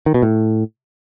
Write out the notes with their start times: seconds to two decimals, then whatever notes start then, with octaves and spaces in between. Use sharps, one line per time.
0.06 D#3
0.14 B2
0.22 A2